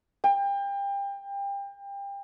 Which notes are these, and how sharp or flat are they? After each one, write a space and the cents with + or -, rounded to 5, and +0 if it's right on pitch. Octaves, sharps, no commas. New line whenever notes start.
G5 +30